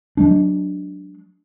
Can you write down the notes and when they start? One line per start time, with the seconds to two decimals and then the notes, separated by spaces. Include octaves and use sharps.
0.17 F#3 G#3 D4